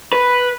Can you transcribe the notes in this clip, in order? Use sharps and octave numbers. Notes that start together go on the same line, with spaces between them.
B4